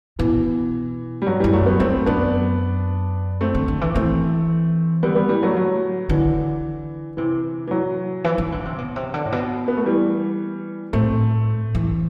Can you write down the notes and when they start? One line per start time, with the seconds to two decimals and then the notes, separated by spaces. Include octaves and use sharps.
0.19 B2 E3
1.22 G3
1.27 G2 F#3
1.40 F#2 E3 G3
1.53 F#3 A3
1.66 G3 B3
1.80 E2 A3 C4
2.06 F#2 B3 D4
3.41 A3 C4
3.55 D3
3.68 D3
3.81 E3
3.94 E3 A3 C4
5.03 D3 G3 B3
5.15 G3 B3
5.29 E3 G3
5.43 F#3 A3
5.57 F#3
6.09 D3 E3
7.17 C3 E3
7.67 E3
7.71 F#3
8.24 E3
8.38 E3
8.52 D3
8.65 C3
8.78 B2
8.96 C3
9.14 D3
9.26 A2
9.32 B2
9.68 B3
9.77 A3
9.86 E3 G3
10.93 A2 A3 C4
11.75 E3